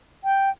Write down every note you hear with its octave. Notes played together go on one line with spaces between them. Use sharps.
G5